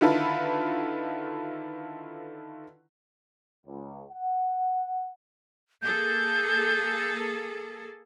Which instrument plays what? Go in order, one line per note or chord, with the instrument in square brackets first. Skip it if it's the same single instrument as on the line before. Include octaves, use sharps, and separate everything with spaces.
[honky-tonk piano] D3 D#3 E4 F4 A4 B4
[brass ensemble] C#2
F#5
[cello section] A#3 G#4 A4 [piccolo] G6